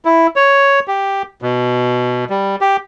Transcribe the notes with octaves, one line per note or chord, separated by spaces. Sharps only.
E4
C#5
G4
B2
G3
G4